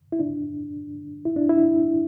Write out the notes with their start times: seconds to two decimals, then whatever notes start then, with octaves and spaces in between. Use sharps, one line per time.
0.12 E4
0.19 D4
1.25 E4
1.36 D4
1.49 E4